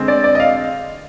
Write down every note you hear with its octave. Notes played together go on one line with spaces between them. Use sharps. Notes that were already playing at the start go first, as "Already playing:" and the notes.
Already playing: D3 G#3 C4
D5
D5
D#5
F5